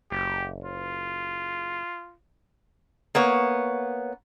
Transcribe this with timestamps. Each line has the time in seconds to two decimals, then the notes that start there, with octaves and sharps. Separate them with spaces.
0.12 F#1 G4
0.64 F4
3.15 A#3 B3 C#5